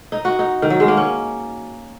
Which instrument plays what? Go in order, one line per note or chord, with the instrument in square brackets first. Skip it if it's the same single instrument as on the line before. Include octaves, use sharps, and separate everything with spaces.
[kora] D#4
F#4
D#4
D#3
F#3
G#3
A#3
C#4